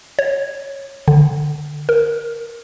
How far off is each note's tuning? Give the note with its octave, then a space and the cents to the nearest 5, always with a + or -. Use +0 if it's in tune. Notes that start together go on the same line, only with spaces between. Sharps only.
C#5 -10
D3 +10
A#4 +0